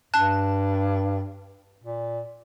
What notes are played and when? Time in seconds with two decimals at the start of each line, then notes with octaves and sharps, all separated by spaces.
0.14 G2 A5 F#6
1.84 A#2